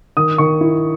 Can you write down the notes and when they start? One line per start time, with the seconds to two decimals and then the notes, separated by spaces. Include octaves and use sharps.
0.17 D#3 D#6
0.38 D#3 C#6
0.61 E4